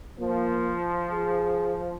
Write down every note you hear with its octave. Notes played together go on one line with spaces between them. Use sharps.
F3 A#3
G#4